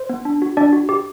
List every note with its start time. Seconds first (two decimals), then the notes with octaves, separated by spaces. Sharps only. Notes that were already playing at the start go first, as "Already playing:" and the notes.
Already playing: C5
0.09 B3
0.25 D4
0.42 F#4
0.57 D4 D5
0.73 F#4
0.89 G4